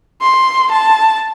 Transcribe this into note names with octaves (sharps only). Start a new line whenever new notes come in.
C6
A5